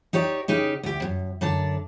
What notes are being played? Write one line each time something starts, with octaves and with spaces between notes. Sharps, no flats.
D#4 G4 C#5 D5
C#3 D#4 G4
D2 G4
F#2
F#2 D3 D5 A5